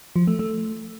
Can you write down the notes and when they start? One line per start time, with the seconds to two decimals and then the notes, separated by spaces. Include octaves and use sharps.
0.16 F3
0.27 A3
0.39 A3